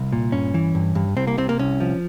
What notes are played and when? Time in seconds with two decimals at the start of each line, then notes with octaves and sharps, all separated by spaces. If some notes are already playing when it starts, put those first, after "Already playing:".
Already playing: C2
0.13 A#2
0.32 G2 C#4
0.54 E3
0.75 G2
0.95 G2
1.16 C2 C4
1.27 A#3
1.38 C3 C4
1.49 A#3
1.59 C2 C#4
1.80 F3